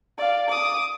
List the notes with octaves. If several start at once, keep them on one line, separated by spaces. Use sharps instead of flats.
D5 F5
D6 D#6